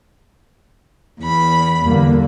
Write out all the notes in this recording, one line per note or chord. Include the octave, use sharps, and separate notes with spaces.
E2 B5
E2 D3 G3 A#3